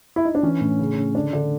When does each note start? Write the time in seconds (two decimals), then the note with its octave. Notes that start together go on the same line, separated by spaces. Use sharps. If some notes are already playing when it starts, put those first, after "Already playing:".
0.16 E4
0.25 D#4
0.35 D4
0.43 E3 C#4
0.61 A2
0.79 C#3
0.97 C#3
1.15 D3 D4
1.33 D3